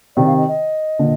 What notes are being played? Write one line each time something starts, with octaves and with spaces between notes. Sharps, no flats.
C3 D#3 D5
F5
D#5
D#5
A#2 D3